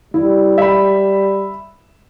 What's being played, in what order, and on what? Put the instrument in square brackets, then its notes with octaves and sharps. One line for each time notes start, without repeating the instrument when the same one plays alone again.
[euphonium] G3 [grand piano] E4
[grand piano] E5 B5